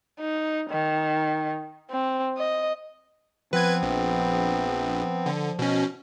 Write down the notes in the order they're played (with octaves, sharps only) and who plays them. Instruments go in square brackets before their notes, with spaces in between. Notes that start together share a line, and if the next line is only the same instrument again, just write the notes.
[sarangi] D#4
D#3
C4
D#5
[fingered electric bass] F3 [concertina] B3 C4 [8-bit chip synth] B4 G#6
[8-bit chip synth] A#1
D3
B2 C#4